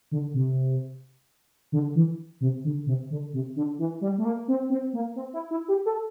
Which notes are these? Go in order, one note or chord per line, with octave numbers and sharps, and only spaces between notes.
D3
C3
D3
E3
C3
D3
C3
D3
C3
D3
E3
G3
A3
A#3
C4
C4
A#3
C4
E4
E4
G4
A4